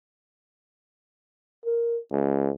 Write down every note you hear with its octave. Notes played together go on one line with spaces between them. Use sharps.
A#4
C#2